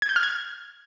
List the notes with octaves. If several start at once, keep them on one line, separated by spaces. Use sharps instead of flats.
G#6
G6
F6
G#6